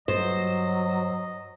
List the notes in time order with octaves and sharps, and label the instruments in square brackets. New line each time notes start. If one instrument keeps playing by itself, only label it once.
[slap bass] G2 [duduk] F#3 [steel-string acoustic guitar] C5 [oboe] D#5